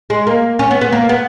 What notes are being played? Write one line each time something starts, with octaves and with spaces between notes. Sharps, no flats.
G#3
A#3
C#4
B3
B3
A#3
B3